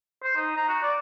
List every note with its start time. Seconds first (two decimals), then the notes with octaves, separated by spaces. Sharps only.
0.24 C5
0.36 D#4
0.56 A#5
0.69 F#4
0.83 D5